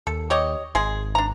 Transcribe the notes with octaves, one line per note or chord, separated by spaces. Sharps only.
D#2 A4
G4 C#5 D#5
G#1 G#3 G#4
D4 A#5